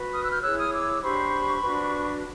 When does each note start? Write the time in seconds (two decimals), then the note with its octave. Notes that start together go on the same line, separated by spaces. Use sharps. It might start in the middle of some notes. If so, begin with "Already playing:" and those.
Already playing: F#4 B4
0.11 D#6 F6
0.21 E6 F#6
0.31 F6 G6
0.42 E4 G#4 C#5 E6 F#6
0.56 D#6 F6
0.72 D6 E6
1.02 D4 G4 C5 B5 C#6
1.61 D4 F#4 B4